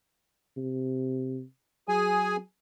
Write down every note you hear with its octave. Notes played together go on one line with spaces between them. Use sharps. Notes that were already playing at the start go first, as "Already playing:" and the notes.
C3
F#3 G#4 G#5